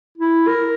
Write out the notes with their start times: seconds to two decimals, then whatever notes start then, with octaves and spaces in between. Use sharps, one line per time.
0.18 E4
0.47 A#4